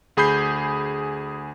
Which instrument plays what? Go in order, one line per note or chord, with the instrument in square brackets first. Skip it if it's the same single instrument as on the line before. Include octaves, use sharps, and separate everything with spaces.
[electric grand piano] D2 G#4 B5 G6 C7